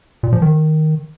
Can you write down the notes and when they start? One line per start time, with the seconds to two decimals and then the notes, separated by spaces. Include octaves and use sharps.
0.23 A#2
0.33 F3
0.42 D#3